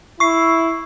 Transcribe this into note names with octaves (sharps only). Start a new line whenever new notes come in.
E4 C#6 C7